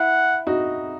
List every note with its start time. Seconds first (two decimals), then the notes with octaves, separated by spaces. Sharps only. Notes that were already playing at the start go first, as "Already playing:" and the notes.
Already playing: E4 F#5
0.47 D#4 F#4